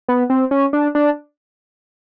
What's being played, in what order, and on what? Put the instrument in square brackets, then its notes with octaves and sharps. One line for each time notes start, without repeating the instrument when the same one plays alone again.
[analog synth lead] B3
C4
C#4
D4
D4